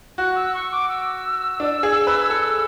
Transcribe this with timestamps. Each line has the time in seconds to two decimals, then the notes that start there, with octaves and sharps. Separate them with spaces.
0.18 F#4 F#6
0.36 E6
0.54 C#6
0.71 D6
0.89 E6
1.60 D4
1.83 G#4
2.07 B4
2.30 A4